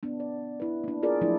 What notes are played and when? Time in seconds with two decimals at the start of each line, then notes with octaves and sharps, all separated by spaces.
0.03 B3 D4
0.20 D5
0.60 E4 B4
0.84 A#3 D4
1.03 F4 G#4 A#4 D5
1.21 F3 F#3 A3 D4 E4